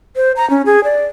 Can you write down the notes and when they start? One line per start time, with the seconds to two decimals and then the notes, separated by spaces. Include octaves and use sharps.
0.16 C5
0.36 A#5
0.50 C#4
0.66 G#4
0.84 D5